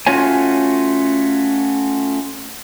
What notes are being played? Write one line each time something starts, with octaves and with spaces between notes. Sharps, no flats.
A3 C#4 F4 F#4 C#5 G#5